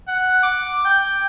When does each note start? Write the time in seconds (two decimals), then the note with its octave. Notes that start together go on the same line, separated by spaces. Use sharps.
0.08 F#5
0.43 D6
0.85 G5